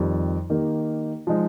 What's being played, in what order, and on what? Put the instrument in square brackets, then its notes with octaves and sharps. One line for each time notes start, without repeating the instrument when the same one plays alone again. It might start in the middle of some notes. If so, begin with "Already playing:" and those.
Already playing: [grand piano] F2 D#3 G3
D#3 A#3 D#4 G4 A#4
F3 G#3 D#4